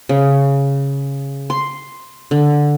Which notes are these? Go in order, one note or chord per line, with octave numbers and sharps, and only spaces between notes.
C#3
C6
D3